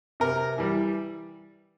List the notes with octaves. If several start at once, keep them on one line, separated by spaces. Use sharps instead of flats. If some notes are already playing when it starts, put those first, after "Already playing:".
C3 A#4
E3 G3